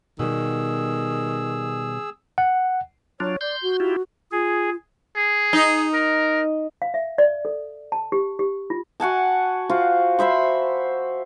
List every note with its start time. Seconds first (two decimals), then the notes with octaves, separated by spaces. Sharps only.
0.19 B2 D#3 G3 G#4 E6
2.38 F#5
3.20 F#3 D4 F4 C#5
3.41 D5 C6 G6
3.62 F#4
3.80 E4 F4 G4
4.32 F4 G#4
5.16 G#4
5.53 D#4
5.94 A#4
6.82 F5
6.94 E5
7.18 D5
7.45 A4
7.92 A5
8.12 G4
8.39 G4
8.70 F4
9.00 F#4 F#5 G#5 A5
9.70 F4 F#4 C5
10.19 C5 E5 B5 C6